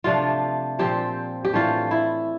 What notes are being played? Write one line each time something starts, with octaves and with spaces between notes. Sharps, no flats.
C3 F3 A3 D4 F4
A#2 F3 C4 G4
G4
A2 E3 A3 D4 F4
E4